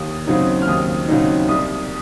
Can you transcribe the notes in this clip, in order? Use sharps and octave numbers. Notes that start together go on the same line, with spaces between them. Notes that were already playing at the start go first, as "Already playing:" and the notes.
Already playing: D#2 D#6
C#3 F#3 C4 D#4
F6
D#2 D#6
C#3 F#3 C4 D#4
C2 D#6